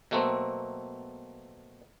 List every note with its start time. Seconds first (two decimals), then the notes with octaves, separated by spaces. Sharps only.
0.11 B2 F#3 A3 A#3 C4